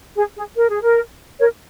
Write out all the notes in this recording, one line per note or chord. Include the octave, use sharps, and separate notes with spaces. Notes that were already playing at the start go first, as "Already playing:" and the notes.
G#4
G#4
A#4
G#4
A#4
A#4 C#5